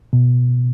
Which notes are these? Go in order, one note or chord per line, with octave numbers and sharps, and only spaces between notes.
B2